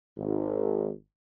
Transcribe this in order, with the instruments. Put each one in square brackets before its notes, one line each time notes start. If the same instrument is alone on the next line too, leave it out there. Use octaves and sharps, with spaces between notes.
[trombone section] G#1